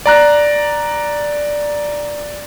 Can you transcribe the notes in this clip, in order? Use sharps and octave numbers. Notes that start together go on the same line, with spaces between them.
D5 A#5 F#6